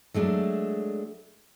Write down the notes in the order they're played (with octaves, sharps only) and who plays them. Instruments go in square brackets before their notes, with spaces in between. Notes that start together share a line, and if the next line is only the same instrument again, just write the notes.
[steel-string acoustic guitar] F#3 G#3 A3 D4